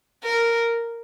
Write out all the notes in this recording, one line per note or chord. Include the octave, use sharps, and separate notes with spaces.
A#4